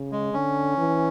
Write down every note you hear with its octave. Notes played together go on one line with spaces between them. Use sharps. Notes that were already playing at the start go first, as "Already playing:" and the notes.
Already playing: C#3
G#3
D3 C#4
E3